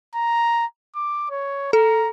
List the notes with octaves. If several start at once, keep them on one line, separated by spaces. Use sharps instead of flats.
A#5
D6
C#5
A4 A#5